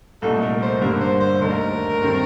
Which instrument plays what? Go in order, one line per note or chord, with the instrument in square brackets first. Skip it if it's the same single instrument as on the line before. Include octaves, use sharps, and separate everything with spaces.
[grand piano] C2 A#2 A3 D#4 [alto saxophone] A4
[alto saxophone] A#4
C5
[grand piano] G2 D3 G3 A#3 [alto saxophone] A#4
[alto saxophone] C5
C5
[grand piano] D#2 D3 A3 D#4 [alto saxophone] A#4
[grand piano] G2 D#3 A3 C4